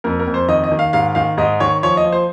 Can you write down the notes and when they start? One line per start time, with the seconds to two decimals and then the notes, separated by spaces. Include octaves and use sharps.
0.04 F2 A#4
0.19 A#4
0.27 F2
0.34 C5
0.48 D#3 D#5
0.64 D#5
0.72 D#3
0.79 F5
0.93 G#2 F5
1.15 D#3 F5
1.38 G#2 D#5
1.60 D#3 C#5
1.83 F3 C#5
1.97 D#5
2.05 F3
2.12 C5